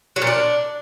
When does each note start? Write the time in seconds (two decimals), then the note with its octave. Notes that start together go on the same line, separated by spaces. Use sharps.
0.16 F#3
0.22 A#2
0.27 D4